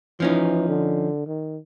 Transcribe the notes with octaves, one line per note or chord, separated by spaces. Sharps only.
E3 F3 C#4 D#4
D3
D#3